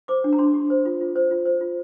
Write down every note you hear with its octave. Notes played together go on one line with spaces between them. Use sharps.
C5 D6
D4
A#5
D4 C6
G4
C5
F4
F4
C5
F4
C5
F4